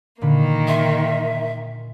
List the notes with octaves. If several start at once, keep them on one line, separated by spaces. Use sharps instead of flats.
A#2 D3 D#3 A#3 B5
G#4 D#5 E5 C6